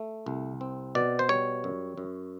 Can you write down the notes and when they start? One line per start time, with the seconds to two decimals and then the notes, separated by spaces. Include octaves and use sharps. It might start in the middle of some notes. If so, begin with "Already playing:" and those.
Already playing: A3
0.26 C2
0.61 C4
0.95 B2 D5
1.19 C5
1.29 G3 C#5
1.64 F#2
1.98 F#2